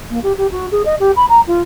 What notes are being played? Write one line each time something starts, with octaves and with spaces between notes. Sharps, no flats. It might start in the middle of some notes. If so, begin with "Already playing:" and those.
A#3
G4
G4
F#4
G#4
D#5
G4
B5
A#5
F4